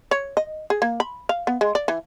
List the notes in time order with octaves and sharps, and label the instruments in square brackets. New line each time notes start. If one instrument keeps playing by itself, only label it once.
[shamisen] C#5
D#5
G#4
A#3
B5
F5
B3
G#3
D5
E3